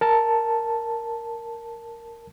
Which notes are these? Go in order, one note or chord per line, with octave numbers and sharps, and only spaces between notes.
A#4 A5